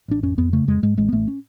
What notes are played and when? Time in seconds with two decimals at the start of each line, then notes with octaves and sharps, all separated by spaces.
0.08 A1 D4
0.23 F2 C#4
0.38 F2 B3
0.53 C#3 A3
0.68 F2 G#3
0.83 G#2 G#3
0.97 A1 G#3
1.09 B3
1.12 A1 A3
1.28 C#4